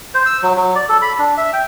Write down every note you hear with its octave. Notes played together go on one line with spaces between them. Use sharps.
C5
E6
F#3
F#3
D5
A4
B5
D4
E5
G5